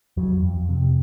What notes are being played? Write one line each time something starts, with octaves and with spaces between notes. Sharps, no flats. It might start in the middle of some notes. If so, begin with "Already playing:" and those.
F2 F#3
F2
C3